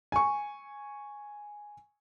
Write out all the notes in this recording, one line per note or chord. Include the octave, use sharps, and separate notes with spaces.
G#5 C#6